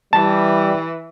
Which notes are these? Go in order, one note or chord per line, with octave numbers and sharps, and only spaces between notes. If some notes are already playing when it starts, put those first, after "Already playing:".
E3 G3 A5